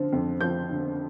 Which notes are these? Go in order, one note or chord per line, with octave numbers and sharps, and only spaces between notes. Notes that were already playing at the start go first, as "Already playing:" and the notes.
Already playing: D3 F3 C4
F2
F3 G6
D3